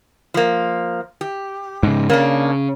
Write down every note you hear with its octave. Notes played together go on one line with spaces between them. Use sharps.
F3 A#3
G4
G#2 C#3
C#3 A#3 D4